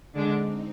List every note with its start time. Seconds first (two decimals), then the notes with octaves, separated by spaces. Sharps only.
0.14 D3 G#3 C4 D4 D#4